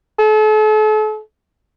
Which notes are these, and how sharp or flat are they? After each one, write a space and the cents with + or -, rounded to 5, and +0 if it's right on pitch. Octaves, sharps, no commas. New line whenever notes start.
A4 -40